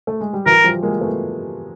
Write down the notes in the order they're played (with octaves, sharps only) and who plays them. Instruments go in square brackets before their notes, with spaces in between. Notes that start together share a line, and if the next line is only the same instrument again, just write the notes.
[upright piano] A3
G#3
G3
[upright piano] E3 F#3 [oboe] A#4
[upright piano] F3 G3
G#3 A#3
A3 B3